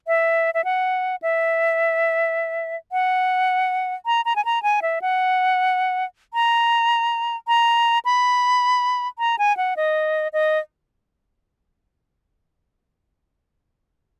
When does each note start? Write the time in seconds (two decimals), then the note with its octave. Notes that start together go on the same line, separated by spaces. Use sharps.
0.07 E5
0.54 E5
0.64 F#5
1.22 E5
2.92 F#5
4.06 A#5
4.25 A#5
4.36 G#5
4.45 A#5
4.63 G#5
4.82 E5
5.02 F#5
6.34 A#5
7.48 A#5
8.05 B5
9.19 A#5
9.39 G#5
9.57 F#5
9.77 D#5
10.33 D#5